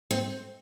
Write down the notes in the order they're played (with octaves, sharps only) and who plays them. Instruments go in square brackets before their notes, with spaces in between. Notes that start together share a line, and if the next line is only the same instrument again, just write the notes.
[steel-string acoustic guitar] C4 [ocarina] C5